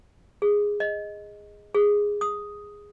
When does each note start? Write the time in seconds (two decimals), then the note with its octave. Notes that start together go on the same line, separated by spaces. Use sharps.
0.42 G#4
0.80 D#5
1.75 G#4
2.21 D#6